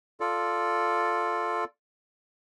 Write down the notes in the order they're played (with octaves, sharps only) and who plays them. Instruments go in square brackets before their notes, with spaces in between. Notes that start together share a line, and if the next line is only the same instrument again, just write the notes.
[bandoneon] F4 A4 D5